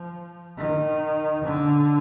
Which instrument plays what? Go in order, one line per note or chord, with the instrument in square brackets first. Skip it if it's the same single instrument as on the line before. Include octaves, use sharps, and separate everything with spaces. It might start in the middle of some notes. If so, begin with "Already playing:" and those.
Already playing: [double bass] F3
D#3
D3